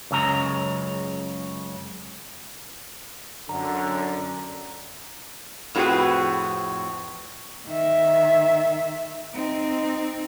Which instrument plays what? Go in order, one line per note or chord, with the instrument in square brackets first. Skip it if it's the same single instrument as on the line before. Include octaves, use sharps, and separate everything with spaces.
[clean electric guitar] C#2 F#2 C#3 A#5
[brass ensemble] F#2 D3 [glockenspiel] A#5
[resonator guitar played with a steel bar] F2 A2 C4 F#4 G#4 B4
[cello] D#3 E5
C4 D#4